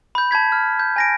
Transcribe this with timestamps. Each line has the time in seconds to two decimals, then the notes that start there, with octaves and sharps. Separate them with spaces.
0.15 B5 G6
0.31 A5 B5 G#6 B6
0.52 F6
0.79 G6
0.96 G#5 A#6 D7